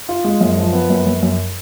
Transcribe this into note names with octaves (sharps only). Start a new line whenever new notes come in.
F4
G#3
F#2
F3
B3
F#2
F#2
F#2